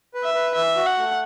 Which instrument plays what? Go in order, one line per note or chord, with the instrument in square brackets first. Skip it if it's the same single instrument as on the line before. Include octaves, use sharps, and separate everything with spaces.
[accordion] B4
[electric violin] E5
[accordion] B4
[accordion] E3 [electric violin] E5
[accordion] F#4
[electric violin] F#5
[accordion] A3